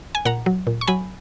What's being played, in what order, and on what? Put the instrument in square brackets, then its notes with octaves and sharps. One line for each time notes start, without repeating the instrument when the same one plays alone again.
[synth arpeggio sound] G#5
A#2 F#5 A#5
F#3
A#2
C#6
F#3 G#5 B5